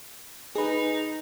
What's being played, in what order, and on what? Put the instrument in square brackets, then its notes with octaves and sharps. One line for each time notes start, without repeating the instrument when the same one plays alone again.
[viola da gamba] D#4 [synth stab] G#4 B4